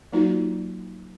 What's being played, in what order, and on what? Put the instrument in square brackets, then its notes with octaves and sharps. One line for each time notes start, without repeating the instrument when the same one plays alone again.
[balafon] F#3 A#3 D#4 F4 F#4